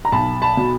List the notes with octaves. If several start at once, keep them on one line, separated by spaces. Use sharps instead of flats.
A#5
B1 A5 B5
A5 B5
B2